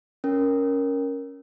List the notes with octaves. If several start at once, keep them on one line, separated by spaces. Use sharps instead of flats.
C#4 A#4